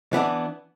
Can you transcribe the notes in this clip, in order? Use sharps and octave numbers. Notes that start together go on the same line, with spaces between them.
E3 B3 D4